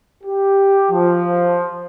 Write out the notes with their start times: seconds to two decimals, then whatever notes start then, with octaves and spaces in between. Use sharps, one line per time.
0.24 G4
0.91 F3